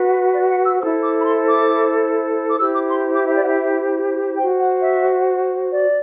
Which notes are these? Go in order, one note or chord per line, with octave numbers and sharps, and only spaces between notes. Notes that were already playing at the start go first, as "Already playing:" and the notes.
Already playing: F#4 B4
D5
F#5
E6
E4 A4 C5 E6
D6
B5
C6
D6
D6
E4 G4 C5 E6
D6
C6
D6
E5
D5
F#5
E5
C5 G5
F#4
F#5
E5
D5